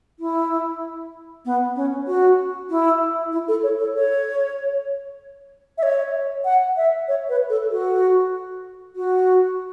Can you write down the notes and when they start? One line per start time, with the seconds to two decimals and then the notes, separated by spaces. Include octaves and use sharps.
0.19 E4
1.45 B3
1.76 C#4
2.07 F#4
2.70 E4
3.32 E4
3.48 A4
3.63 C#5
3.80 A4
3.95 C#5
5.78 E5
5.83 C#5
6.45 F#5
6.77 E5
7.08 C#5
7.29 B4
7.49 A4
7.71 F#4
8.96 F#4